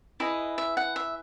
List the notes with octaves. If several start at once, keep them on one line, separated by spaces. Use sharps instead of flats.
E4 G#4 B4 D#5
E5
F#5
E5